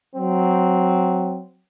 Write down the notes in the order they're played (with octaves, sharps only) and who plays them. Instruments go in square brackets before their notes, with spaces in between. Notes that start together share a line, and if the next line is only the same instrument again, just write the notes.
[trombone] F#3 [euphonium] C4